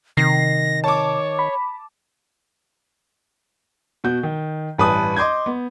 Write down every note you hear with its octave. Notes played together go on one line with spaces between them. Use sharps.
C3 D#3 A#6 C7
C#5 A5 D6
B5
B2 F#4 G6
D#3
A1 G2 B4 G#5 A5 D#6
D#5 C6 D6 G6 G#6
B3